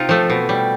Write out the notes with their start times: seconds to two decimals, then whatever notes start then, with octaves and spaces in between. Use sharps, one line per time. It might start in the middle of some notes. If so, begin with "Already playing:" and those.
Already playing: C3 D#4 F4
0.09 F3 A3
0.30 B2
0.49 G3